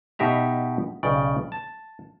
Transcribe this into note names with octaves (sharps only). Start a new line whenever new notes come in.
B2 D#4 G4 E5 A#5
B1 C#3 D5 G5
A5